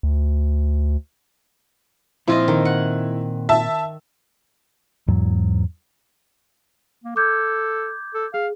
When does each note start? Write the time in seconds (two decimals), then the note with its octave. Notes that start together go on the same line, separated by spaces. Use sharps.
0.03 D2
2.28 A#2 F3 C4 E4 F4 D#5
2.48 D#3
2.65 F#5
3.49 E5 A5
5.08 E2 G#2 F#3
7.04 A#3
7.16 A4 D6 G6 G#6
8.14 A4
8.34 G#4 F5